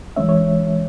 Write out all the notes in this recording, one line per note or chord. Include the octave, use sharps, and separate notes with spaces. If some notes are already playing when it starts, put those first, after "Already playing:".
E3 G#3 C#4 C#5 E5
C#5